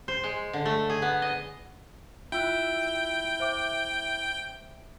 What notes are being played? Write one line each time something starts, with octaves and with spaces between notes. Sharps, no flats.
C5
G#3
D3
A3
G#4
B3
D#5
E4 F4 G5 E6 F#6
C5 E5 D6